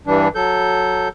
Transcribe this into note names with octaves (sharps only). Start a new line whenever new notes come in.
G2 E3 G3 D4
F#3 A4 G6